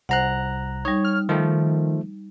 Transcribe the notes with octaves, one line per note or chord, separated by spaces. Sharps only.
C2 C5 F#5 A#5 F#6
G3 D#4 C#5
F6
D#3 F3 A3